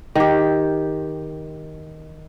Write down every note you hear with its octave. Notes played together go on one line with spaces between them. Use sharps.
D#3 G4